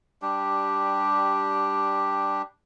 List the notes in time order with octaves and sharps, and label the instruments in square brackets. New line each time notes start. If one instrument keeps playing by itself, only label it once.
[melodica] G3 D4 G4